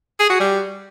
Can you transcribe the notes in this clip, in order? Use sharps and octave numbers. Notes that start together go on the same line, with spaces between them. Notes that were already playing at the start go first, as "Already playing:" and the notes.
G#4
F#4
G3